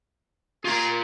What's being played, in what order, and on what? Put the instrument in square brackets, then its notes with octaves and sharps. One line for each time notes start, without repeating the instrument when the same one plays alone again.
[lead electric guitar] F4 A#5 [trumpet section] G4 G#4